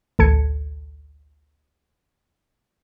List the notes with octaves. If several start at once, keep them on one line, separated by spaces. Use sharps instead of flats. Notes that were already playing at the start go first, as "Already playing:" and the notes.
A1 D2 A4 A5 G#6 C#7